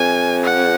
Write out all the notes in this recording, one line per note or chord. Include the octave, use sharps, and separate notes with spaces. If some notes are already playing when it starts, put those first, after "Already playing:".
Already playing: F2 G#5
F#5